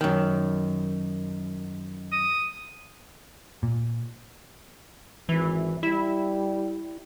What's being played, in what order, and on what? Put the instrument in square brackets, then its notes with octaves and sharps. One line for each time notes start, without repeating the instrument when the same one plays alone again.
[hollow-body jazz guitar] F#2 D#3
[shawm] D#6
[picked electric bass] A#2
[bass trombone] G#1 [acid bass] E3
[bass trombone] G3 [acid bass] E4